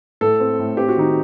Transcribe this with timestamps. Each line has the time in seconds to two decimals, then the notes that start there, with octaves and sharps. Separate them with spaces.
0.21 A2 A4
0.40 C4
0.59 A2
0.77 C4 G4
0.88 F#4
0.96 D#3 D#4